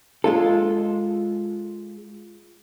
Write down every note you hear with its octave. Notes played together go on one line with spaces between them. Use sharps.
G#3 F4 A4